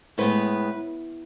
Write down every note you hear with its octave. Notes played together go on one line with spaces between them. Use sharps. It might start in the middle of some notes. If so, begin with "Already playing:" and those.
A2 G#3 B3 B4